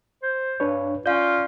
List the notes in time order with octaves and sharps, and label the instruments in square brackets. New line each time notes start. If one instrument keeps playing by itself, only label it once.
[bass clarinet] C5
[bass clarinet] G2 [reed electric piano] D4 B4 C#5
[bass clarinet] C#4 [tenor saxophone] F4 [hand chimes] D5 F5 [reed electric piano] G6